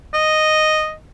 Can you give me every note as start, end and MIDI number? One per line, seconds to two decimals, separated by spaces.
0.14 0.93 75